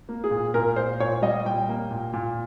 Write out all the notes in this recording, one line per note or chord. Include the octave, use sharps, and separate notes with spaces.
A#3
G#4
A#2
A#2 A#4
A#2 C5
A#2 C#5
G3 D#5
A#2 G5
A#3
A#2
A#2